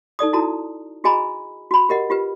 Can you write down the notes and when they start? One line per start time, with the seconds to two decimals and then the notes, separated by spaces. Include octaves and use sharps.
0.19 D#4 A4 D5 D#6
0.33 E4 F#4 A4 A5 A#5
1.04 F#4 G#4 D#5 G#5 A#5 B5
1.71 F#4 B5
1.89 G4 A#4 D#5 F#5
2.10 F4 G4 B4